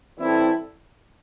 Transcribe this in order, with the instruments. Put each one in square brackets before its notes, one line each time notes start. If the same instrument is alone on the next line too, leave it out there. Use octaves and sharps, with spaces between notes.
[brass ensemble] E3 G3 C4 E4 A4